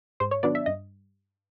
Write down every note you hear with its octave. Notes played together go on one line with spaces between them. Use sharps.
G#2 C5
C#5
D#3 F#3 B3 D4 D5
E5
G2 D#5